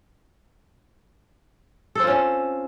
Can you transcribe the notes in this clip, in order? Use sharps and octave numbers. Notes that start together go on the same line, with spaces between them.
C4 C#4 F4 A4